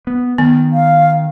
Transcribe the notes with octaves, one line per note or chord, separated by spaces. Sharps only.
B3
D#3 B3
F5